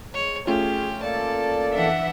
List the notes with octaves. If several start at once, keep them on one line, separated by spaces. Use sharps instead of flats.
G#3 C#5
A3 C#4 F4 G4 G#4
A#3 A4 D5 A5
E3 D4 E5 F#5